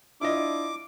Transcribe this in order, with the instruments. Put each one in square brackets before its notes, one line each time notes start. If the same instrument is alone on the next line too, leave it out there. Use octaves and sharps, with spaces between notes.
[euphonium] D4 [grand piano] E4 F4 D#5 [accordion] D6